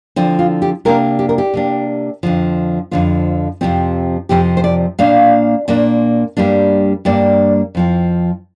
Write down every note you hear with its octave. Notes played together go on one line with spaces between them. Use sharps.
D3 F3 C4
F4
G4
C3 A#3 D4 A#4
G4
A#4
G4
C3 A#3 D4
F2 D3 F3
F2 D3 F3 F4
F2 C3 F3 C4
F2 C3 F3 C4 G4
C5
D5
A#2 A#3 D4 F5
A#2 A#3 D4
G2 G3 A#3 D4
G2 G3 A#3 D4 D5
F2 F3 C4